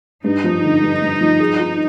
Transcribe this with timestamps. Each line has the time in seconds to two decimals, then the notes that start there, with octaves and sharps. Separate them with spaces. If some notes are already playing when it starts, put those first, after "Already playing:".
0.24 G2 D#4
0.44 F3
0.63 D3
0.82 G2
1.02 G2
1.21 F3
1.40 G#4
1.59 F4